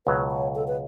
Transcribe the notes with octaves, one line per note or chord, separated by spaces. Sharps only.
C#2 B2 F#3 B4
C#5
A4
B4